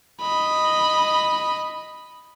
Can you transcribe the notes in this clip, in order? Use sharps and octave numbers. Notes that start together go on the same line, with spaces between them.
D#5 B5